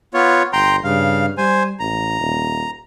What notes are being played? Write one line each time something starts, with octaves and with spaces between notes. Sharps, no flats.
B3 F4 C#5
G1 G5 A#5 C6
G2 C#3 F5
G3 C5 G#5
A1 A#5
D#1